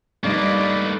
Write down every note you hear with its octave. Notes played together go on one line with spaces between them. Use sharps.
G2 A3 A#3 D#4 B4 D5 D#5